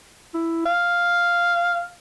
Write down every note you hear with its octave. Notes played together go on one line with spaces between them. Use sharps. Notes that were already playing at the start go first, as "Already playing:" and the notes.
E4
F5